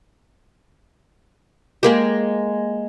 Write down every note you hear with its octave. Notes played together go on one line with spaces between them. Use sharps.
G#3 A#3 G4